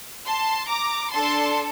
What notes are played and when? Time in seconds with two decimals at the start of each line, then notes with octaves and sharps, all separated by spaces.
0.27 A5 C6
0.70 A#5 D6
1.13 D4 A4 A5 C6